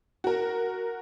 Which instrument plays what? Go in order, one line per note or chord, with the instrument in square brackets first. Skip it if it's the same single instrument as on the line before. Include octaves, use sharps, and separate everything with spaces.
[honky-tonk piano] F#4 A#4